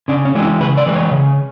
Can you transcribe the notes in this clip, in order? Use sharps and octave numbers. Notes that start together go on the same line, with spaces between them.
C#3 D4
C#4
E3 G#3 D4
E4
C#3 B4
D5
E3 G#3 B4
C#5
C#3